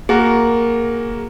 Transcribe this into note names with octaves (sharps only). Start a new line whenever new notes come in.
A#3 F#4 G#4 A#4